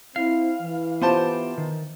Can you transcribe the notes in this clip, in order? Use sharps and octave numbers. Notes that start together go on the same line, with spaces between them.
C4 E4 F5
E3
B3 F4 G4 C5 A5
D#3